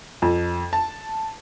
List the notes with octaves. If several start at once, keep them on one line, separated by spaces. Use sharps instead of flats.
F2
A5